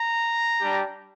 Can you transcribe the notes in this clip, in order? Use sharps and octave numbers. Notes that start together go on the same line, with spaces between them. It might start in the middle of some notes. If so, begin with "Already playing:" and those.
Already playing: A#5
G3 D4 G4